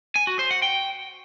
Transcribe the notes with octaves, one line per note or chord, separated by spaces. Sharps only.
G#5
F#4
C5
F#5
G5